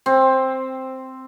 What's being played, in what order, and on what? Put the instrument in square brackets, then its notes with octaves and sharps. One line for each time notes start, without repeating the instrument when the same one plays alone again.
[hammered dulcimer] C4